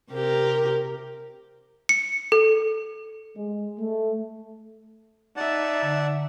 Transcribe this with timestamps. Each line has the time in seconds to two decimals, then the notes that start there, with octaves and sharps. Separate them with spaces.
0.11 C3 G4 A#4
1.89 C#7
2.32 A4
3.36 G#3
3.79 A3
5.36 D#4 D5 E5 F#5 A5
5.82 D3